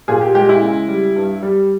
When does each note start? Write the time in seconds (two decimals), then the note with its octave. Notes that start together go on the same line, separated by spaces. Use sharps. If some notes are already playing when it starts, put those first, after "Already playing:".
0.08 A#2 G#4
0.21 G4
0.34 G#3 G4
0.49 E4
0.62 C#3
0.88 G3
1.16 G2
1.43 G3